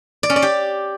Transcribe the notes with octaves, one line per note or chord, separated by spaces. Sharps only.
D5
C#4
D5
G4